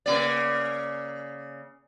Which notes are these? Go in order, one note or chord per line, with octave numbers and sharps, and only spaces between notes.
C#3 A#3 D5